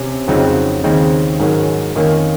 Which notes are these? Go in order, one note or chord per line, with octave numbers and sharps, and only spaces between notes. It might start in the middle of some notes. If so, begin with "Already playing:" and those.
Already playing: C3 C#4
F2 C#3 F#3 C4 D#4
D#2 C#3 G#3 C4 D#4
G#2 D#3 F#3 C#4
F2 D#3 A#3 C#4